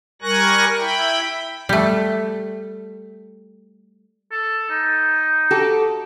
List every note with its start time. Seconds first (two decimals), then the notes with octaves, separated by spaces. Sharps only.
0.22 G3 A#4 G#5 C#6 F#6 A#6
0.79 E4 G5 B5
1.69 G3 A3
4.32 A4
4.70 D#4
5.51 F#4 G4 A4